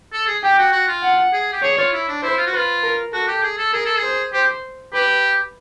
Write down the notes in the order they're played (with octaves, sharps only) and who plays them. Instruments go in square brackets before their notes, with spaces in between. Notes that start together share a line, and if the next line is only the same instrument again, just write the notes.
[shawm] A4
G#4
[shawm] G4 [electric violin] G5
[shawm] F#4
F#4
F4
[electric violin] F#5
[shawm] G#4
G4
[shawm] G#4 [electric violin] C#5
[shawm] F4
E4
D4
[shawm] E4 [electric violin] C5
[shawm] F4
F#4
[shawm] F4 [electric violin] B4
[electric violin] A#4
[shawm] F#4 [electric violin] A4
[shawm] G4
G#4
A4
[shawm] G#4 [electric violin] A#4
[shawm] A4
G#4
[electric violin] C5
[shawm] G4 [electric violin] C5
[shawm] G4 [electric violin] B4